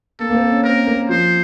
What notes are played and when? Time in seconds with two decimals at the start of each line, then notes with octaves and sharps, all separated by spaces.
0.19 A#3 A4
0.30 A#3
0.34 C4
0.49 C#4
0.64 C4 A#4
0.87 A#3
1.09 F3 C5